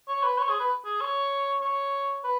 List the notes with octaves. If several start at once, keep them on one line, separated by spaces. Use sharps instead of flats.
C#5
B4
C#5
G#4
B4
G#4
C#5
C#5
B4